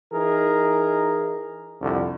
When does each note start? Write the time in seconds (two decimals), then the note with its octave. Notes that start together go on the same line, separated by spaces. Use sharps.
0.13 E3 D#4 G#4 A#4
1.82 C2 F2 D3